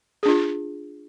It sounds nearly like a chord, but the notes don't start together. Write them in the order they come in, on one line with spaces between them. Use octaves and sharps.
G#4 D4 F4